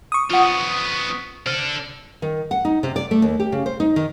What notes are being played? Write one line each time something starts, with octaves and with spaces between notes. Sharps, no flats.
C#6 D#6
F3 B3 F4 F#5
C3 D4 A4 F6
D#3
F#5
D#4
C3
D5
A3
D#2
G4
C#3
C5
D#4
D#3